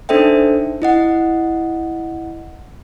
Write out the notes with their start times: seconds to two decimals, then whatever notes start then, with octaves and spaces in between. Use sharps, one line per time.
0.09 D4 D#4 A4 C5 E5 G5
0.82 E4 D#5 F#5